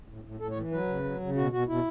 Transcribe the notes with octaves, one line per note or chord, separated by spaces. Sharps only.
A2
A2
A2 A4
C#5
E3
F#3 B4
C#3
F#3
C#3
B2 F#4
B2 F#4
B2 E4